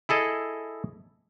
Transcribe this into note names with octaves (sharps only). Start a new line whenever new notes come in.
E4 G#4 A4 D#5